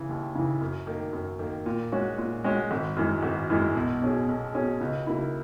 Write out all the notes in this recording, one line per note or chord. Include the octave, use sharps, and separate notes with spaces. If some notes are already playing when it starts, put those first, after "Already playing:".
Already playing: C#3 E3
D#2
C#3 E3
F#2
D#3 A#3
F#2
D#3 A#3
A#2
G#3 C#4 F#4
A#2
G#3 C#4 F#4
G#1
F#2 E3 G#3
G#1
F#2 E3 G#3
B1
B2 F#3 C#4 G#4
B1
B2 F#3 C#4 G#4
C#2
C#3 F#3 A#3 E4